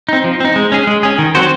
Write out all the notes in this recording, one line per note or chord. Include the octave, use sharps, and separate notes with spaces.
C4 D#4
F3
C4 D#4
G#3
C#4 G#4
G#3
C#4 G#4
D#3
F#3 C4 F#4 C5